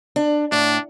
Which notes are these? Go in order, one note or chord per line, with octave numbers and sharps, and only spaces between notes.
D4
A2 D4